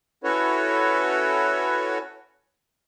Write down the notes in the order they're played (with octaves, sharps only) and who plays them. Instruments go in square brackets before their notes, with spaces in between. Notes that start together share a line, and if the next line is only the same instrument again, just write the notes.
[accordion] C#4 E4 F#4 A4 B4 C#5